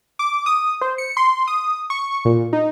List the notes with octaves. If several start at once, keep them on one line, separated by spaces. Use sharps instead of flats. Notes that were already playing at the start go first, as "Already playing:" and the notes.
D6
D#6
C5
C#7
C6
D#6
C#6
A#2
D#4